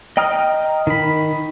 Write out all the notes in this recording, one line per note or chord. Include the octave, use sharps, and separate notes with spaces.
D#5 G5 A#5 D#6 F6
D#3 B5